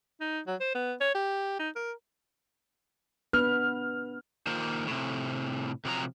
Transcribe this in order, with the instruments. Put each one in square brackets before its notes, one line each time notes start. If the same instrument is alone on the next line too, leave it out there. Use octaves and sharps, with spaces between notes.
[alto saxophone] D#4
F#3
C5
B3
C#5
G4
D#4
A#4
[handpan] B3 D4 B4 [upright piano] F6
[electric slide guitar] D#3 A#3 F4 C5
A2 C3
C3 F3 F#3 D5 A#5